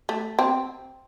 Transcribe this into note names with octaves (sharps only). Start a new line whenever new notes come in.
A3
C4